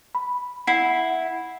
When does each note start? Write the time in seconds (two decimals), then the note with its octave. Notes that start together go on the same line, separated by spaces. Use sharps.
0.15 B5
0.67 E4 F#5 C7